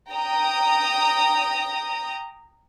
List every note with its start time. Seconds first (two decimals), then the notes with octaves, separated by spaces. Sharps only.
0.11 G5 A#5 D#6